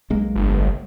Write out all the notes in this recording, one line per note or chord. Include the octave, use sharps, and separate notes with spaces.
B1 G#3 A#3
G1